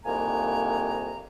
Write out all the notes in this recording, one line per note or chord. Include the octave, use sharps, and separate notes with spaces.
C2 F2 D#3 A#3 G#5 A#5